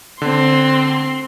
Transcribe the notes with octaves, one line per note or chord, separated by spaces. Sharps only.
D3 C4 C6